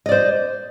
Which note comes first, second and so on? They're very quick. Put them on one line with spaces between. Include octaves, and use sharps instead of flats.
D#5 D5 C5